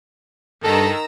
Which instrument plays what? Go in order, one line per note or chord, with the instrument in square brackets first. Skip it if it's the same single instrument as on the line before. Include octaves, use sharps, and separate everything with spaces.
[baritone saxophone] G2 [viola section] D#3 [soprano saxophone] A4 [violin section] A#5 E6